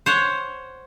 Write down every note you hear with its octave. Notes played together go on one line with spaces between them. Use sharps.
C5 C#5 F#5